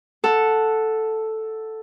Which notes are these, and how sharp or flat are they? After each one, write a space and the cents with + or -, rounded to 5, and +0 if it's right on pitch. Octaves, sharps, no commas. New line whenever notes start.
A4 +0 F#5 -10